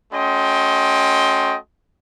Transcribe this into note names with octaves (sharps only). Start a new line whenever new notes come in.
A3 C#4 F#4 D#5 G5 C6